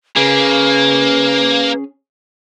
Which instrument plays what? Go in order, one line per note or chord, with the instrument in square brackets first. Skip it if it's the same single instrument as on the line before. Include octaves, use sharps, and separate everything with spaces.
[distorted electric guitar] A#3 [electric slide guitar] C#4 G#4 [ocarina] B4